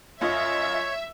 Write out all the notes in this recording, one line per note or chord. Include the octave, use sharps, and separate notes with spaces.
F#2 F4 C#5 D#5 E5